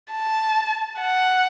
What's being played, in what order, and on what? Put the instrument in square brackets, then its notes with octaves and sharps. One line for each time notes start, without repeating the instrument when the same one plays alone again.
[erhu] A5
F#5